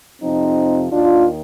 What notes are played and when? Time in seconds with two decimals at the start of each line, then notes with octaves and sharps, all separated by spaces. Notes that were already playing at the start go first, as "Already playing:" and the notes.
0.22 F2 C3 F3 C4 D#4
0.92 D#2 D#3 D4 F4